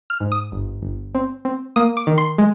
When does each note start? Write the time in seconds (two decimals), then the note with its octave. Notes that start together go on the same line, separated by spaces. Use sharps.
0.10 F6
0.20 G#2
0.32 D#6
0.52 G1
0.82 G1
1.15 C4
1.45 C4
1.76 A#3 D#6
1.97 D6
2.07 D#3
2.18 C6
2.38 G#3